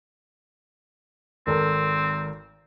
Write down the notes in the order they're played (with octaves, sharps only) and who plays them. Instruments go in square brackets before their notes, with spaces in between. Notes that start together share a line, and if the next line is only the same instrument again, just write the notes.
[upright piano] G#1 A4 A#4 [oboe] C4